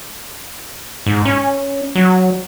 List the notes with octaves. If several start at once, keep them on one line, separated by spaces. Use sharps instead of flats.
G#2
C#4
F#3